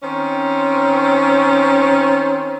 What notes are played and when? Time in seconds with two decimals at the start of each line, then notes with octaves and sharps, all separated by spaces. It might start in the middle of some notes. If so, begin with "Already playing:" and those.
0.02 D#3 C4 C#4